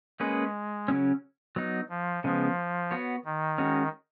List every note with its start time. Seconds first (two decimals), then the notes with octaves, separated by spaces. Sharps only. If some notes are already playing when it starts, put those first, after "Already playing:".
0.20 G#3 A#3 C#4 G#4 B4
0.88 C#3 F#3 C#4
1.56 F#3 B3 D#4
1.90 F3
2.23 C#3 F3 G#3 B3
2.91 B3 F#4 C#5
3.25 D#3
3.58 G#3 C#4 F#4